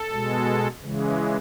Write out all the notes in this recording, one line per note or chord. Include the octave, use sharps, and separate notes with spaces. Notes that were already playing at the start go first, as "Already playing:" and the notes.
Already playing: A4
B2 G#3
C#3 E3 G#3